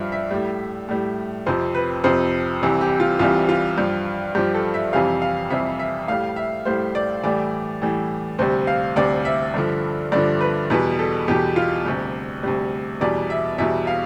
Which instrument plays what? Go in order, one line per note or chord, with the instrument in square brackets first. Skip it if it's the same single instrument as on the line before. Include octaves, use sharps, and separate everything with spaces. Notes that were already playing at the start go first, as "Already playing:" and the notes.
Already playing: [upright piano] G2 F3 E5 F5
E5
A2 G3
A2 G3
F2 C3 F3 C5
B4
F2 C3 F3 C5
C2 C3 E3 G3
G4
F4
C2 C3 E3 G3 F4
F4
G2 F3
G2 F3 G4
A4
E5
F2 C3 E3 G3 F5
F5
F2 C3 E3 G3 E5
E5
A2 G3 F5
E5
A2 G3 C5
D5
A2 E3 G3 D5
A2 E3 G3
D2 C3 G3 C5
F5
D2 C3 G3 D5
E5
G2 D3 F3
G2 D3 F3 D5
B4
E2 B2 G3 B4
A4
E2 B2 G3 G4
F4
D2 C3 G3 G4
D2 C3 G3
E2 B2 G3 D5
E5
E2 B2 G3 E5
F5